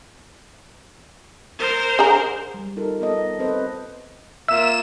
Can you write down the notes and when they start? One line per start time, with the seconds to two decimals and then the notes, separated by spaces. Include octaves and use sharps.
1.58 A#4 C5
1.99 D3 G#4 A#5
2.54 G3
2.77 D#4 F4 A4 A#4
3.01 B3 A4 D#5
3.39 C4 A4 B4 C5 D#5
4.48 A#3 F4 E5 E6 E7